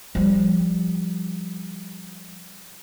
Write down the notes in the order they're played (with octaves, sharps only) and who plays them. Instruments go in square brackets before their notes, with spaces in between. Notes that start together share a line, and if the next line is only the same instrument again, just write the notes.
[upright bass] F3 G3